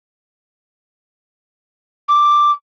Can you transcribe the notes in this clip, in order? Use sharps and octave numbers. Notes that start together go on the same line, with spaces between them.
D6